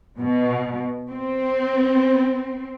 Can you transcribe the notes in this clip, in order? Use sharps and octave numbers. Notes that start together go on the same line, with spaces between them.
B2
C4